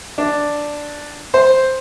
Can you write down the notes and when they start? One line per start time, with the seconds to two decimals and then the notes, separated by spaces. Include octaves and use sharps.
0.18 D4
1.34 C5